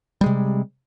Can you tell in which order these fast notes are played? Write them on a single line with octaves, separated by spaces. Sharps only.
G3 G#3 C3